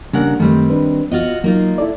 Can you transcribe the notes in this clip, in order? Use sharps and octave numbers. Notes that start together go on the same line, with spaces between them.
C#3 G3 A#3 D4 A#4 F#5
F#2 D#3 G3 A3 C4
D4 B4
B3 F4 F#4 D#5
F#3 A#3 D#4 F4
E4 A4 D5